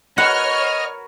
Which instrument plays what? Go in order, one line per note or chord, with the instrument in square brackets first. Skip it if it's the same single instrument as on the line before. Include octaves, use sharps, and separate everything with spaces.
[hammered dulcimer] F#4 A#4 B4 [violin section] C#5 F6 [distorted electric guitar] D#5 [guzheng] F#5